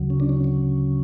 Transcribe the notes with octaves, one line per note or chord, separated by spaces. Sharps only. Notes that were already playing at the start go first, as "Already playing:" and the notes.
Already playing: D2 C#3 F#3
C#4
D4
C#4
C#4